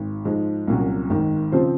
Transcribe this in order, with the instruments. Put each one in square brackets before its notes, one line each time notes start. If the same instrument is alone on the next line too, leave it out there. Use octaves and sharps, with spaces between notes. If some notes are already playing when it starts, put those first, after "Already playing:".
Already playing: [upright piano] G#1
G#2 F3 G#3
C2 A#2 F#3 C#4 F#4
G#1 G#2 D#3
C#3 F3 C4 F4 C5